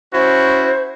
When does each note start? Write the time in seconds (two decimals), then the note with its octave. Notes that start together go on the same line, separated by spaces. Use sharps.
0.13 C#4 E4 F#4 C5